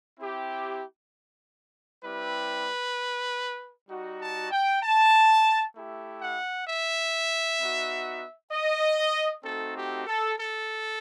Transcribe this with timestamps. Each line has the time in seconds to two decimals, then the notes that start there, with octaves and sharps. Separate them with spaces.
0.18 C4 E4 G4
2.03 G3 C4 E4 G4 B4
3.89 G3 D#4 F#4
4.19 A5
4.50 G5
4.81 A5
5.74 A3 E4 G4
6.20 F#5
6.66 E5
7.59 B3 D#4 F#4
8.51 D#5
9.44 A3 C4 D#4 F#4 A4
9.75 G4
10.05 A4
10.36 A4